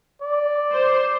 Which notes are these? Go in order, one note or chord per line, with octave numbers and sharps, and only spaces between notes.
D5
C5